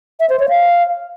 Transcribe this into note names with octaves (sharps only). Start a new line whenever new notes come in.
E5
C5
C#5
F5